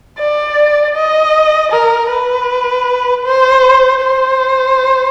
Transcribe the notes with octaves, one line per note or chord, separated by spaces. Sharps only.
D5
D#5
A#4
B4
C5
C5